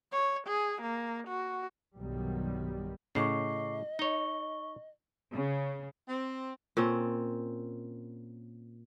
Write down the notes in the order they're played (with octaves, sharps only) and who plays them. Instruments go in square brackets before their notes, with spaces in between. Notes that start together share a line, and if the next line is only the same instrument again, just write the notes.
[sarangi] C#5
G#4
A#3
F#4
[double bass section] B1 G2 B2 D#3 F#3 G3
[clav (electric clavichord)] A2 C#3 [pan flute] D#5 [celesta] C#6 D6 C7
[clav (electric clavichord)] D#4 C#5 [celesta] C#6 G7
[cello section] C#3
[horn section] C4
[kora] A#2 C4 C#4